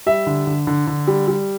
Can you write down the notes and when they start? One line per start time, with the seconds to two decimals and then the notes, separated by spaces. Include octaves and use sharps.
0.06 G3 E5
0.27 D3
0.47 D3
0.67 D3
0.87 D3
1.07 G3
1.28 G3